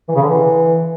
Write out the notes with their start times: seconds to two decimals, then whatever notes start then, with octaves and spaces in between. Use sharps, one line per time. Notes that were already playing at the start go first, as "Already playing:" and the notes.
0.09 E3
0.16 C#3
0.22 D3
0.29 E3